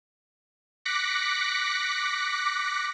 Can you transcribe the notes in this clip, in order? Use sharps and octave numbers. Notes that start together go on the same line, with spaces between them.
D6 F#6 A#6 B6 C#7